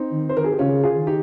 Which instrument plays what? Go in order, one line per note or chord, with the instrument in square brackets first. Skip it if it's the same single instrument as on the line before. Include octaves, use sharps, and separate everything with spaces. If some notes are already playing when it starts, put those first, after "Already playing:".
Already playing: [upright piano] C4 D#4
[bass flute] D#3
[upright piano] C5
[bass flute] D#3 [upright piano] A#4
[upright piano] G#4
G4
[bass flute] C#3 [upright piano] C#4 F4
[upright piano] F4 G#4
[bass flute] D#3
[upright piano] D#4 G4